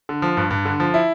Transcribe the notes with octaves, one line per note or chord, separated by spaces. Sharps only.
D3
F3
G2
G2
D3
F3
E4